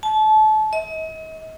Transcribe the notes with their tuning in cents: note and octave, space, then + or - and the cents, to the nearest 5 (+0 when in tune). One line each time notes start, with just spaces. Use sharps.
A5 -30
D#5 +40